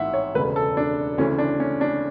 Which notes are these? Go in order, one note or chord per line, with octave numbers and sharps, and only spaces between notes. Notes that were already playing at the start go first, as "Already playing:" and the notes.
Already playing: A1 G#2 E3 E5 F#5
C#5
E1 D2 C#3 B4
A4
D4
D2 C#3 E3 C#4
D4
C#4
D4